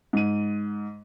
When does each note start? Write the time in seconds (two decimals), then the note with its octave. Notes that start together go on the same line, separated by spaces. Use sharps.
0.13 G#2 D#7